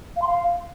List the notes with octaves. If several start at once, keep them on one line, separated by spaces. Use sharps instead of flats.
F5
C6
F5